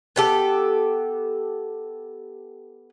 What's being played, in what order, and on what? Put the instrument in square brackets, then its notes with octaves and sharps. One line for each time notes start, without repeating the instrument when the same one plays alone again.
[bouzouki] B3 G4 A4